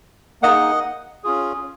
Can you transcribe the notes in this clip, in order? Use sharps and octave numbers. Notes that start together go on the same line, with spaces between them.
A#3 D#4 G#4 D#5 F#5
C#4 F4 G#4